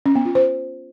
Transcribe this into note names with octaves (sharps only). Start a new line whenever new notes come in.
C#4
B3
F4
C5